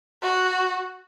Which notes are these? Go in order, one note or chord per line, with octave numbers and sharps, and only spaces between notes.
F#4